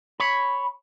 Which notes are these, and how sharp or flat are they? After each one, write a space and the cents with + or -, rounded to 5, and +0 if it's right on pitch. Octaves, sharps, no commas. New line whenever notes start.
C#5 +0 B5 +0